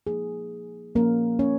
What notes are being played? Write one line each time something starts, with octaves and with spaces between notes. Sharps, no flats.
F3 A#3 D#4 G#4
F3 A#3 C#4 A#4
C#4 C#5